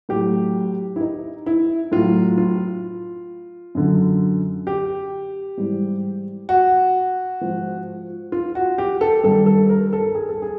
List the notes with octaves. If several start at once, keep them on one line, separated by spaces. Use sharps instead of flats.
A2 F#3 G4
E4
D#4
E4
A2 F#3 F4
F4
F#2 D3 F#3
G4
G#2 E3 G3
F#4
G#2 F3
F4
F#4
G4
A4
G2 D#3 G3 A4
A4
A#4
A4
G#4
A4
G#4